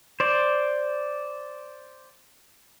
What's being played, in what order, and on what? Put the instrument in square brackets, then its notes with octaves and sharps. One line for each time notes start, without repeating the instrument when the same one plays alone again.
[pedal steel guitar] C5 D5